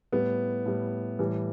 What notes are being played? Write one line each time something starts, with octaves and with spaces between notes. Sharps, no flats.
A2 G3 B3
A2 G3
A2 E3 G3